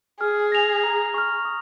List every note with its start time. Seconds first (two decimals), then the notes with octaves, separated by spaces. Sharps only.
0.20 G#4 F6
0.52 A#6 F7
0.83 A#5
1.14 C#6 F6
1.45 D#6